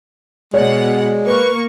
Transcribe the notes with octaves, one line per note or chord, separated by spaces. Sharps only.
B2 G#3 C#5 D5 F#5
A#3 B4 C#6